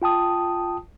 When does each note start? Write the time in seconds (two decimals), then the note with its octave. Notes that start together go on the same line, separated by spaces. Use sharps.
0.02 F4 G5 A5 D#6